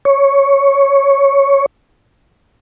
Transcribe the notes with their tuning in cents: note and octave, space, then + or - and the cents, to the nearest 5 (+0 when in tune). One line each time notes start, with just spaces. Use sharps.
C#5 +0